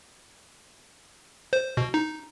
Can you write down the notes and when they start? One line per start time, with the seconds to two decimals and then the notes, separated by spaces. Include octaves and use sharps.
1.53 C5
1.77 B2
1.94 D#4